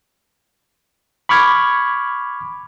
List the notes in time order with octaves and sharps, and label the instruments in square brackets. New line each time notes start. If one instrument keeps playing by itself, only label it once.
[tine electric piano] B5 C#6 D6 F6 G#6